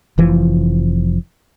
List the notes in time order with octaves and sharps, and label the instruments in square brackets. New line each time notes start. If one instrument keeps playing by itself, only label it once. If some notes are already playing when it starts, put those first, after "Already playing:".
[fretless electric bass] F1 E3 F3